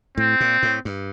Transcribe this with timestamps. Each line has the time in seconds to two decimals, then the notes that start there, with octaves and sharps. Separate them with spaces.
0.17 A2 C4
0.40 A#2
0.63 A2
0.85 G2